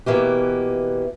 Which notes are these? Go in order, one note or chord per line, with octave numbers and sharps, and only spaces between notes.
B2 E3 A#3 G4